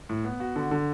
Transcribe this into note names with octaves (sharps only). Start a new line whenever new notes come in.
A2
B3
F#4
D3
D3